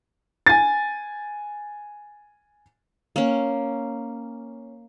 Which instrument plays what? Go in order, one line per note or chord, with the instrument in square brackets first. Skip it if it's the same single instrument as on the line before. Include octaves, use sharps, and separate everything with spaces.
[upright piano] G#5 A6
[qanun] A#3 C#4